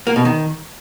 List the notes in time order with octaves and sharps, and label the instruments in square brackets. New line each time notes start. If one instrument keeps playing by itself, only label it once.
[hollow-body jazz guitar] A#3
B2
D#3